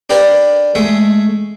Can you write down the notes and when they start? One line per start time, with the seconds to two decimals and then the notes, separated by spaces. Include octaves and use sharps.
0.10 D4 G4 A#4 B4 D5
0.75 G#3 A3 E5